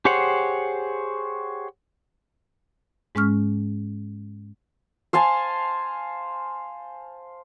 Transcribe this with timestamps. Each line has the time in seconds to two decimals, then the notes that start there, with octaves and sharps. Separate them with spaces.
0.05 G4 G#4 C5 C#5 F#5
3.15 G#2 G#3 C#4 C#6 F6
5.13 C5 F5 G#5 A5